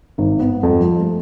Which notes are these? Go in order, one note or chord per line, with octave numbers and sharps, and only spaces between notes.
G#1
B3
F2
F3
A3